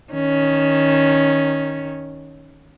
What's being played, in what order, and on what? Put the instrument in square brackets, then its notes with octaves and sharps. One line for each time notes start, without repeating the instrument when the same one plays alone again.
[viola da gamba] D#3 C#4